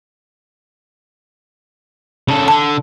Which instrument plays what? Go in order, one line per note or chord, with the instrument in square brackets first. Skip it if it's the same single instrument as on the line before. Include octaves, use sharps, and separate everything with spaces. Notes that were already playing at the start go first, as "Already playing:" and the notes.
[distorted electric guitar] C#3 A4
[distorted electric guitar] D3 [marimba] A5